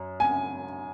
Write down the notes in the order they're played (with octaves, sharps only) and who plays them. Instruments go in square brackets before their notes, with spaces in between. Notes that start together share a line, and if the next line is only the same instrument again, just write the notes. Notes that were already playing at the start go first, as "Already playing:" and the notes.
Already playing: [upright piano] F#2
G#5